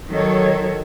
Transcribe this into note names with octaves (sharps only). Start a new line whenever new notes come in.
D#3 F#3 A4 C#5